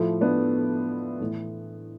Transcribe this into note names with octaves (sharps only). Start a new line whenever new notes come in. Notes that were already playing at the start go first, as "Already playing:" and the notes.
Already playing: A2 F3 A3
B3 D4
A2 E3